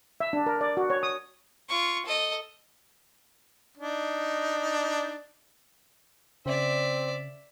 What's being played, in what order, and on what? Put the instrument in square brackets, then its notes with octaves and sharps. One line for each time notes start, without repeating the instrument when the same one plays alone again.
[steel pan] E5
D4
A#4
D5
F#4
C#5
D#6
[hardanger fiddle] F4 C#6
A4 D#5
[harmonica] D4 D#4
[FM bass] C#3 [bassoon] C4 [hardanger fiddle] D5 E5